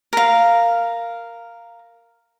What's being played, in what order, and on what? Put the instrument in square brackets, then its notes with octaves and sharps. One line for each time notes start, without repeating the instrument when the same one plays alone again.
[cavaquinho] A#4 F5